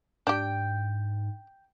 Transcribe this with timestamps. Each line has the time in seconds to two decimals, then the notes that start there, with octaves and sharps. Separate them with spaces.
0.27 G#2 D4 G4 G5